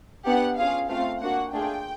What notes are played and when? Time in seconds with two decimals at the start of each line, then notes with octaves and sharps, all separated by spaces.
0.25 B3 D4 G4 F#5
0.56 C#4 F4 G#4 F5
0.88 A3 C4 F4 F5
1.20 A#3 D4 F#4 F#5
1.52 A3 D4 F4 G#4 G5